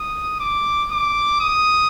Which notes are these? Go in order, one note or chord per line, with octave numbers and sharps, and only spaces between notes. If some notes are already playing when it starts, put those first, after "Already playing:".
Already playing: D#6
D6
D6
D#6